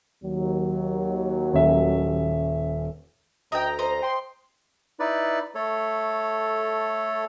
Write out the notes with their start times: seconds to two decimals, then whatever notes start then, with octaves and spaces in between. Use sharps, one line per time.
0.24 D#2 F#3
1.54 D#1 C#4 E5
3.52 D2 D#5 G5 A#5
3.79 C5 D#5
4.03 G5 C6
5.00 D#4 E4 B4 D5
5.55 A3 A4 C#5